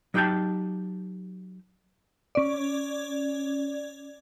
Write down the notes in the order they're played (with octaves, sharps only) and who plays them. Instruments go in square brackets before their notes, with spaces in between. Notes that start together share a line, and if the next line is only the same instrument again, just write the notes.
[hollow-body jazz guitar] F#3 D#4 G4 F#5 G5 A5
[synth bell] C#4 D5